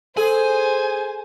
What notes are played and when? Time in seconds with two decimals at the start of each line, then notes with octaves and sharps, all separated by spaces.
0.17 G#4 A4 C5 G#5